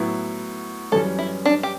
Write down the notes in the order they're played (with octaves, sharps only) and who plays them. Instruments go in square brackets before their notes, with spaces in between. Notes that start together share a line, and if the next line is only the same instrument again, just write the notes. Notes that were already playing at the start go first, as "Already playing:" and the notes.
Already playing: [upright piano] A2 F#3 B3 E4
[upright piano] F#2 E3 G3 C#4 [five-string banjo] A4
[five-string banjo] E4
D4
G4